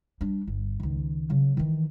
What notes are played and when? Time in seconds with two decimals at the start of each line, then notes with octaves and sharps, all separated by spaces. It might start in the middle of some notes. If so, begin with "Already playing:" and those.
0.21 G3 D4
0.47 G1
0.80 C#2 D#3
1.30 C#3 F#3
1.57 D#3 E3